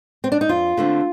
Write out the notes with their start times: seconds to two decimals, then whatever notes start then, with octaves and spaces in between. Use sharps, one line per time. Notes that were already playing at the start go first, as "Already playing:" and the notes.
0.24 C4
0.32 D4
0.41 D#4
0.49 F2 F4
0.77 D3 A3 C4